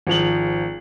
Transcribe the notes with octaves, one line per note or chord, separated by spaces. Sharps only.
G#1 F3 F7 F#7